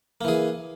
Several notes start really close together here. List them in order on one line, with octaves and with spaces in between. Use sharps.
A#3 E3 G#4